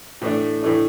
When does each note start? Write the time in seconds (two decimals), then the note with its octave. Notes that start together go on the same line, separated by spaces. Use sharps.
0.21 A2 E3 A3 D4
0.63 A2 E3 A3 D4